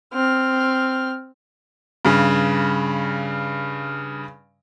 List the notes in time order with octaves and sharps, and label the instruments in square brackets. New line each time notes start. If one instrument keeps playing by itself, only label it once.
[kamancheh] C4 F6
[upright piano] G2 C#3